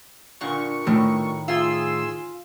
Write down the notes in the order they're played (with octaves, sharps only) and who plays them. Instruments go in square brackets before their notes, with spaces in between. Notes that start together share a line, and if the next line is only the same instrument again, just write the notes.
[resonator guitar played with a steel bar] G2 A#2 D3 [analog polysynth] C#6
[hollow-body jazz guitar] A2 D#3 A3
[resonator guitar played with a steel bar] F4 [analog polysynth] G#4 C6 E6